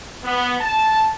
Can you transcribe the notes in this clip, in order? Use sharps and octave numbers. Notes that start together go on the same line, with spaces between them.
B3
A5